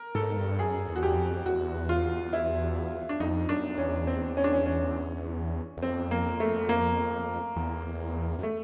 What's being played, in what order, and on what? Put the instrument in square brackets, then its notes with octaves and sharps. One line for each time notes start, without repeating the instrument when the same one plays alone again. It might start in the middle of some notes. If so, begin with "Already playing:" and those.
Already playing: [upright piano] A#4
[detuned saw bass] G#2 [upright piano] A4
[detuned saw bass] G2
[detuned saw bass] F#2 [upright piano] G#4
[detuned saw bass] E2
[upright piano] F#4
G4
[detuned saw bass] F2
[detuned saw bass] E2 [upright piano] F#4
[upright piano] F4
E4
D4
[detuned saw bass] F2 [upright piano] D#4
[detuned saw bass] F#2 [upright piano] D4
[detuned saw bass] E2 [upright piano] C#4
[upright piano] C4
C#4
D4
C#4
C#4
[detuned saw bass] E2
[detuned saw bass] F2 [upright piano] C4
[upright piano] A#3
A3
A#3
[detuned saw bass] E2
F#2
[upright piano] A3